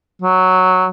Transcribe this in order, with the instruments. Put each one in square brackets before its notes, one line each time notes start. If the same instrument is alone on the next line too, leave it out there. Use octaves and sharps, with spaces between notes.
[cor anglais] F#3